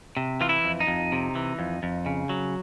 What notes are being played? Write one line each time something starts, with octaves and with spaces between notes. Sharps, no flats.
C3
E3 F4
E4
F2
D#4
F2
C3
E3
F2
F2
C#3
F#3